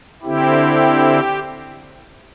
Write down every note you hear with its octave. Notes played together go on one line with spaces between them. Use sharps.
D3 C4 E4 G4